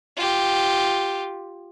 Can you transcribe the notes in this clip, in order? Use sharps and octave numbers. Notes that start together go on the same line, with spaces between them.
F4 G4